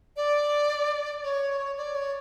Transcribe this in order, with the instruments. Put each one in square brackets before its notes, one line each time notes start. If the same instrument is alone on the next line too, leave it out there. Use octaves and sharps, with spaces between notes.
[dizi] D5
C#5
D5
C#5